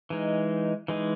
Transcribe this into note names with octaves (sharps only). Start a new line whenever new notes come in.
E3 G#3 D#4
E3 G#3 D#4